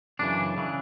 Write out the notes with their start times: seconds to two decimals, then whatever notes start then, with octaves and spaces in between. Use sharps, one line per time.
0.19 F#2 C#3 E3 D4
0.58 C#3 E3